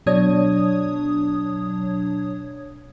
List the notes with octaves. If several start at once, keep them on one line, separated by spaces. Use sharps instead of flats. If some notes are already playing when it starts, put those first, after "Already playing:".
B2 F#3 D4 C#5 D#6 G#6